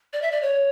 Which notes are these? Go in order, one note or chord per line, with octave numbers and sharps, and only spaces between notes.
D5
E5
D5
C#5